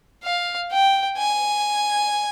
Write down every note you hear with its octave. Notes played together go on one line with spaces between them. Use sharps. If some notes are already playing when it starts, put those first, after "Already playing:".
F5
G5
G#5